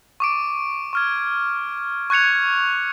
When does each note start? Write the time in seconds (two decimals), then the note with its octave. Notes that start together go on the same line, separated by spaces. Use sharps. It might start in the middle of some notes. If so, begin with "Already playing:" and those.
0.20 C#6 D6 D7
0.93 C#6 F6 G#6
2.10 C#6 F#6 G#6 C#7 F7